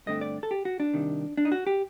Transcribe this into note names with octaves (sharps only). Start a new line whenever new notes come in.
G2 D3 A3 C4 D#5
D5
A4
G4
F#4
D4
C2 C3 D#3
D4
D#4
F#4
G4